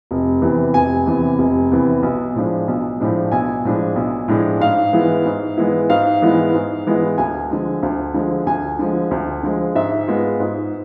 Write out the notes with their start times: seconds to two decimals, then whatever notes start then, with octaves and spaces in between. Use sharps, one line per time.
0.11 F1
0.42 E2 C3 E3
0.74 F1 G#5
1.06 E2 C3 E3
1.38 F1
1.71 E2 C3 E3
2.03 B1
2.35 A2 F3 G#3 D4
2.68 B1
3.00 A2 F3 G#3 D4
3.32 B1 G#5
3.65 A2 F3 G#3 D4
3.96 B1
4.28 A2 F3 G#3 D4
4.60 G#2 F5
4.93 E3 G#3 B3 E4
5.26 G#2
5.57 E3 G#3 B3 E4
5.90 G#2 F5
6.22 E3 G#3 B3 E4
6.54 G#2
6.87 E3 G#3 B3 E4
7.18 D2 G#5
7.50 D3 F3 G#3
7.83 D2
8.14 D3 F3 G#3
8.46 D2 G#5
8.79 D3 F3 G#3
9.11 D2
9.43 D3 F3 G#3
9.75 G#2 E5
10.07 G#3 B3 F4
10.40 G#2